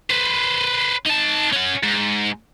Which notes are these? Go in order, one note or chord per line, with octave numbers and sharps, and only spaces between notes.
B4 C5
D#4 A5
C#4 F#5
G#2